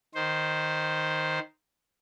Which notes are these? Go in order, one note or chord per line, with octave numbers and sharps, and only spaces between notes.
D#3 C5